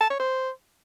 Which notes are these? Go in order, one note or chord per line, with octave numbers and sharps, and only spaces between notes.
A5
C#5
C5